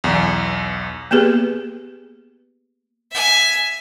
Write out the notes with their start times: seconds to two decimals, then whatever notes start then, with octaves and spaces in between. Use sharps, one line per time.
0.04 B1 E2
1.11 A#3 B3 G4 G#4 B4
3.11 E5 G#5